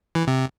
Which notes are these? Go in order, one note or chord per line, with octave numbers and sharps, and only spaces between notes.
E3
C3